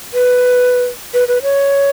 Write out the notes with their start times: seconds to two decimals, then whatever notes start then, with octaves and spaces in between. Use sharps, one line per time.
0.13 B4
1.14 B4
1.28 B4
1.43 C#5